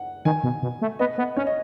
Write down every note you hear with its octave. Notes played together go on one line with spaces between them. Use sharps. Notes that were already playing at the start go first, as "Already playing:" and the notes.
Already playing: F#5
D#3 G#5
B2
B2
A3
B3 D#5
B3
C#4 C#5
D#5